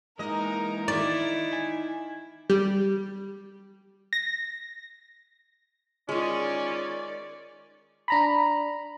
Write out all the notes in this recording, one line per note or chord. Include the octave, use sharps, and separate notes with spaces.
E3 G#3 A#3 D#4 A#4 D#5
D#3 E4 D5
G#5
G3
A#6
D#3 G#3 C#4 F4 D5
D4 A#5 B5